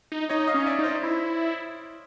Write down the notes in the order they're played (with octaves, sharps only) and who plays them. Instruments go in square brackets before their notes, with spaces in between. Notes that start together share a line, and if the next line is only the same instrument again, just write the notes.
[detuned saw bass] D#4
[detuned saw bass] D#4 [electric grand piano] C#5 D#5
[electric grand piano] D#5 F5
[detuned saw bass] C#4
[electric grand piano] D5 E5
[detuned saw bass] D#4
[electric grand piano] C5 D5
[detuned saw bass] E4